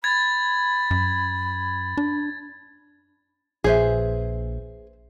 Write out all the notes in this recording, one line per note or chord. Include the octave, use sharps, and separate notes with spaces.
B5 G#6 A6
F#2
D4
A#1 G#4 B4 C5 E5